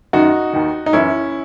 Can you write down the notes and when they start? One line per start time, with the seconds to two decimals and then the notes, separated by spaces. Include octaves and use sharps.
0.13 F#2 D#3 D#4 F#4
0.53 D#2 D#3
0.86 D#4
0.93 F#2 E3 C#4 E4